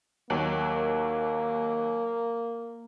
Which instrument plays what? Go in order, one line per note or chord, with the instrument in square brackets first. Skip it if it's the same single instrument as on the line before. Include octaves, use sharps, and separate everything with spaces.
[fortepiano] D#2 F#3 [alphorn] A#3